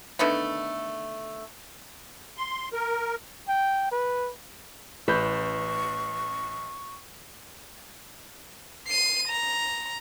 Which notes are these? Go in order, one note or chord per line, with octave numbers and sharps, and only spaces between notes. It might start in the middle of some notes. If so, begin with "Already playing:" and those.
D3 D#3 A3 B3
C6
A#4
G5
B4
A1 B4 C#6 G6
C7 D#7
A#5